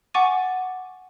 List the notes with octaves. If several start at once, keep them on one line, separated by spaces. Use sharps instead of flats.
F#5 G#5 C#6 D6 A6 D#7